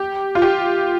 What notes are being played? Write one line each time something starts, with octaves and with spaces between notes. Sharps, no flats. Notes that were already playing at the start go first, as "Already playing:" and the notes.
Already playing: G4
F4
G4